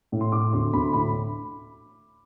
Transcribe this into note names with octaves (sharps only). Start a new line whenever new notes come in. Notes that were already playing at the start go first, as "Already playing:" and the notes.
A2
C6
A2 D6
D2 C6
D2 B5
A2 B5